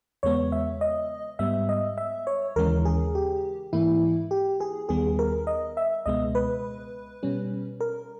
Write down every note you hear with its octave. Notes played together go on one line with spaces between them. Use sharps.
E2 C#3 G#3 B3 C#5
E5
D#5
G#2 G3 B3 E5
D#5
E5
C#5
D#2 C#3 E3 G#3 C#4 A#4
G#4
G4
G#2 E3 A#3 E4
G4
G#4
D#2 D#3 G3 B3 G#4
A#4
D#5
E5
C#2 B2 G#3 B3 D#5
B4
B2 G3 C#4
A#4